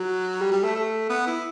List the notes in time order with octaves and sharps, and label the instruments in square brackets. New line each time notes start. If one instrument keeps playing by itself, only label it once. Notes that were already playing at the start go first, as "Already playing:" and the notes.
Already playing: [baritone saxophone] F#3
G3
G3
A3
A3
B3
E4